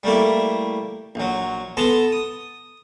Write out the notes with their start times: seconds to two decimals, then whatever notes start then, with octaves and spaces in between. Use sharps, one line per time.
0.03 G3 A3 A#3 E4
1.15 A#1 F#3
1.77 B3 A4 A5 A#5 C6
2.12 D#6